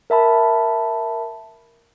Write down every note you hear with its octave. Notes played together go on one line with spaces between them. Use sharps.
A#4 E5 A5 B5